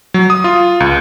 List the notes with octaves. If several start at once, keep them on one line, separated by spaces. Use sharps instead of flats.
F#3
D#6
F4
C#2